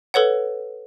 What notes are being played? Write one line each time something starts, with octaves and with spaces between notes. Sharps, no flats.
A4 B4 C#5 F#5